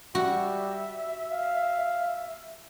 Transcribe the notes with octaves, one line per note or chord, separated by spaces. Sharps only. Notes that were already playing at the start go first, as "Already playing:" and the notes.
G3 F#4 E5
F5